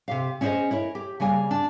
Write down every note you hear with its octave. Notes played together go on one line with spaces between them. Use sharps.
C3 G4 F5
C#4 E4 G#4 B4 C5 D#5
E4 A#4 C#5
G4
C#3 G3 A#3 G#5
D4